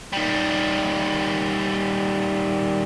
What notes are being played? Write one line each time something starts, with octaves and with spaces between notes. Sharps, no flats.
D#3 G3